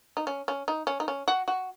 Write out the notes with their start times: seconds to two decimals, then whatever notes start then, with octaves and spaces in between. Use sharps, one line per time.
0.17 D#4
0.27 C#4
0.48 C#4
0.68 D#4
0.87 C#4
1.00 D#4
1.08 C#4
1.28 F#4
1.48 F#4